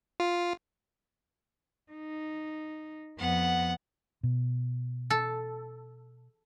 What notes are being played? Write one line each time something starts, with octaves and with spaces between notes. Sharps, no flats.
F4
D#4
F2 B3 F#5
B2
A4